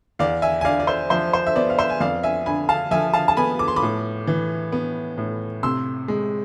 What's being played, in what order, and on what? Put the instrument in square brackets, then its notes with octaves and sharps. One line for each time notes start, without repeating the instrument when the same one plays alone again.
[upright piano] E2 D5 F5
E5 G#5
G#5
D3 D5 F5
D5
C5 E5
F3 C5 E5
C5
E5
B3 D5
F5
C5 E5
G#5
F2 D5 F5
E5 G#5
D3 G#5 B5
F5 A5
F3 E5 G#5
F5 A5
A5
B3 G#5 B5
D6
C6
B5 D6
A2
E3
B3
A2
C3 C6 E6
G#3